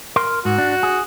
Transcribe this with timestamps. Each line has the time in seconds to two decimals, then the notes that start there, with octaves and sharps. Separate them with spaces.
0.16 A#4 C6
0.45 G#2 F#4
0.58 D4
0.83 G#4